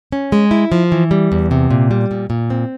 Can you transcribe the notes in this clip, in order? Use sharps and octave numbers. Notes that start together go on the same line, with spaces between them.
C#4
G#3
E4
F3
E3
G3
E2
C3
A#2
G3
A#2
A#2
C4